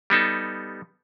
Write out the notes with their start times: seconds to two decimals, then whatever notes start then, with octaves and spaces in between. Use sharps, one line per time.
0.10 G3 B3 D#4 A4